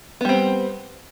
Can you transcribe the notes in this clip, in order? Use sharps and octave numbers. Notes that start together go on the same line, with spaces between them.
G3 B3 C4